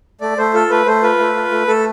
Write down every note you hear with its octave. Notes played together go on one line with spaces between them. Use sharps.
A3 D5
A3 C5
F4 A4
A3 B4
A3 C5
F4 B4
A3
F4
A3
A3 A4